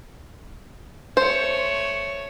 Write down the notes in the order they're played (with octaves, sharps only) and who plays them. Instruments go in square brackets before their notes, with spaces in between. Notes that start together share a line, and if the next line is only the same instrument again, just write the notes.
[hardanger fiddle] A3 C#5 [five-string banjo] C5